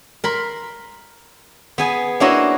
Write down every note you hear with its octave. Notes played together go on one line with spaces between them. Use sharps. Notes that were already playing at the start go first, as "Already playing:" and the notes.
A#4 B5 C6
B3 G#4 G#5
A#3 D4 E4 F#4 C#5 D#5